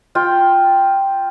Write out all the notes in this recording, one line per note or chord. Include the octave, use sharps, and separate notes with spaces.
F4 G5